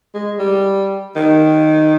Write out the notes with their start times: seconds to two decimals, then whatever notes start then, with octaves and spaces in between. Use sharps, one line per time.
0.14 G#3
0.39 G3
1.16 D#3